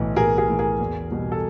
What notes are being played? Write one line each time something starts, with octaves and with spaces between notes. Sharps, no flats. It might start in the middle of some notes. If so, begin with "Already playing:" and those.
Already playing: B1 A2 E3
B1 G#4 A#4
G#4 A#4
A2 E3
G#4 A#4
E2
B2 G3
A4